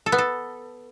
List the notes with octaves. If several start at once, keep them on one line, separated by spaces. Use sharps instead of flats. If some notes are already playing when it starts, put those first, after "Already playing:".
A4
B3
A4